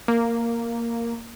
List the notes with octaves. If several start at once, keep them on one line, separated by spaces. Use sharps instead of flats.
A#3